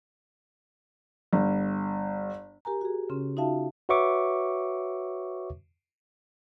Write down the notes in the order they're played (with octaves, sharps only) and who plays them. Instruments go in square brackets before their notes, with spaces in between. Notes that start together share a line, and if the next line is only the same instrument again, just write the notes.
[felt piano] G1
[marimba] G4 A#4 G#5 A#5
F#4 G#4
C#3 C#4 C6
D#4 F4 F#4 E5 F5 A5
[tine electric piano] F#4 B4 C#5 E5 C#6 D6